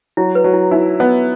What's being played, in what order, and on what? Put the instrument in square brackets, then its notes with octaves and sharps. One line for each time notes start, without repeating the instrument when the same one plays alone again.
[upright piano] F#3 [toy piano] E4
[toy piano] B4
[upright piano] F#3
[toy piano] E4
[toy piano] D#4 [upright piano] E4
[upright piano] B3